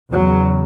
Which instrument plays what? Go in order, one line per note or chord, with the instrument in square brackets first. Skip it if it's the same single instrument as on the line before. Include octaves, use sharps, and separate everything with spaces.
[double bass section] E2 C#3 F#3